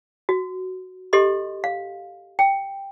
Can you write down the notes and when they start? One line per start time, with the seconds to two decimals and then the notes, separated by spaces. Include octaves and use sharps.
0.29 F#4
1.13 G4 A4 D#5 C6
1.64 F5
2.39 G5